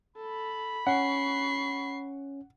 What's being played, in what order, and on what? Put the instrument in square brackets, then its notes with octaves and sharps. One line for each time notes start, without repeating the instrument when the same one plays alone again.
[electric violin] A4 [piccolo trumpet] B5
[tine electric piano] C#4 [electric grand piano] F#5 [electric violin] C#6 C7